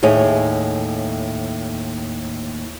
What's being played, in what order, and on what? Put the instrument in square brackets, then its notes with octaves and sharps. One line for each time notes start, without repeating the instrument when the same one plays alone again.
[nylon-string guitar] D#2 A2 G#4 C#5